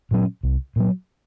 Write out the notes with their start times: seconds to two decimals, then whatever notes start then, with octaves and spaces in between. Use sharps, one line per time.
0.11 A#2 F#3 C#4
0.43 C2
0.76 A#2 F#3